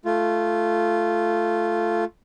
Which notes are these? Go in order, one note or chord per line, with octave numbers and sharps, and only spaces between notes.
A3 F4